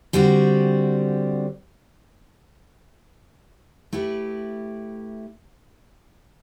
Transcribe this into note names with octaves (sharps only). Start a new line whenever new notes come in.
D3 G3 C4 F#4
A3 E4 G4 B4